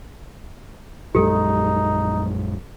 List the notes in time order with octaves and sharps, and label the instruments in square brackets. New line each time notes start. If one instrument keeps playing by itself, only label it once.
[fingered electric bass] A#1 F#2 G#3 [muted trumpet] D#4 [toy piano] G4 A4